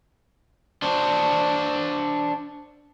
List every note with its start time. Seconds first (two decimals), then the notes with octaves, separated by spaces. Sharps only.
0.82 D4 C5